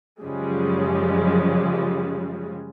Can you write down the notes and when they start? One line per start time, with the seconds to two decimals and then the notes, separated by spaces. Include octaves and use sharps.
0.21 F#2 C#3 F3 G3 G#3